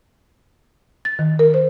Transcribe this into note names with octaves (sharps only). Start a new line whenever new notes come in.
A6
D#3
A#4
C5